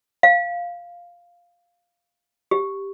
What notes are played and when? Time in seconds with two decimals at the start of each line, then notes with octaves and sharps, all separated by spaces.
0.23 F5
2.51 G4